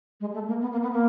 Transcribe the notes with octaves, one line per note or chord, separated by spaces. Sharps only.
G#3
A3
A#3
B3
A#3
B3
A#3